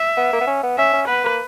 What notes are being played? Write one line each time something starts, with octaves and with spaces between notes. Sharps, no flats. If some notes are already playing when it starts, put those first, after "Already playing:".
Already playing: E5
B3
A#3
B3
C#4
B3
C#4 E5
C#4
B3 B4
A#3